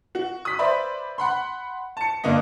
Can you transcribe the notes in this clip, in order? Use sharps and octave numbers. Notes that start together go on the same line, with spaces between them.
F#4
D#6 B6
B4 C5 D5 E5 B5
F#5 B5 C6
A5 C#7
G2 D3 A#3 D4 D#5